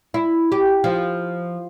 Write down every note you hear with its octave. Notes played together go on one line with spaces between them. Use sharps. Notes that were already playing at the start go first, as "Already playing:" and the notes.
E4
G4
F3